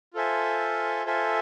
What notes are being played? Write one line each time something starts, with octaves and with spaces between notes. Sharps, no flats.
F4 A4 C5 E5 G#5
F4 A4 C5 E5 G#5